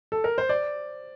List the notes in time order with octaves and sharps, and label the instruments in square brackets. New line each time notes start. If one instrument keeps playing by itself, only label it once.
[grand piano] A4
A#4
C5
D5